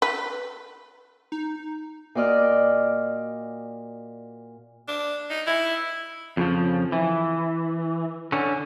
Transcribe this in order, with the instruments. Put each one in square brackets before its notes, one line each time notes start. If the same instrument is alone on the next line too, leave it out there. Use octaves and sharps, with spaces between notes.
[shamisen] B4
[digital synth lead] D#4
[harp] A#2 F#4 D5 D#5 F6
[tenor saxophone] D4
D#4
E4
[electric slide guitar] F2 C#3 F3
E3
D3 C#4